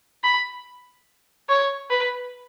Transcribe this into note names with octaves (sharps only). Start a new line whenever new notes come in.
B5
C#5
B4